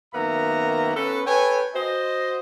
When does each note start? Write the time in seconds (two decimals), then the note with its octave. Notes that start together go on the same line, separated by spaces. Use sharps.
0.13 F#2 D#3 A#3 B3 E5 A#5
0.96 B3 C#4 A4 B4
1.27 A4 B4 C#5 G5 G#5
1.75 F#4 C5 D#5